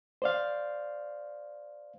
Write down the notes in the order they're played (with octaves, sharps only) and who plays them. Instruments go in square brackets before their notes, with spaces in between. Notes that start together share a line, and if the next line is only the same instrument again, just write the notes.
[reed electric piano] C5 D5 F5